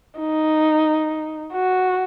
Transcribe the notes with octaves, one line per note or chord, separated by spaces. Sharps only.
D#4
F#4